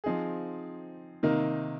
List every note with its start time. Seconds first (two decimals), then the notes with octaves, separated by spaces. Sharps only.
0.04 F3 C4 D#4 G#4
1.23 C3 D#3 A#3 D#4 A#4